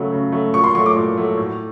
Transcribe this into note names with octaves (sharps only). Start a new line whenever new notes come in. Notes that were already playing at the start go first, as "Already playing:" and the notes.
Already playing: C#3 F#3 A3
C#3
F#3 A3
A#2 C#6
C6
F#3 A3 C#6
D6
A#2
F#3 A3
A2